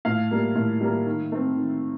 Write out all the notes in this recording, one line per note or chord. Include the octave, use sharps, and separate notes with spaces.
A2 F5
G3 A#3
A2
G3 A#3
D#3
A3 C4
D#3